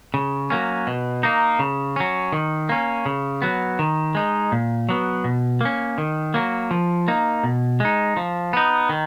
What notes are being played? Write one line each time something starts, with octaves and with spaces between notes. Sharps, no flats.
C#3
F#3 A#3 C#4
B2
A#3 D#4
C#3
F#3 C#4
D#3
A#3 C#4
C#3
F#3 B3
D#3
G#3 D#4
A#2
F#3 B3
B2
A#3 C#4
D#3
F#3 A#3
F3
A#3 D#4
B2
G#3 D#4
F3
B3 D#4
D#3